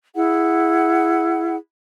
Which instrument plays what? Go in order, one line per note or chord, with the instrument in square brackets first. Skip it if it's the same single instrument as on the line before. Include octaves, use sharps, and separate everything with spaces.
[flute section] E4 G#4 F#5